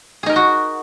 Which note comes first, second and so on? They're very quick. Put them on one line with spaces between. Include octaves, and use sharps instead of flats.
G#4 D#4 A#4 D#5 F#4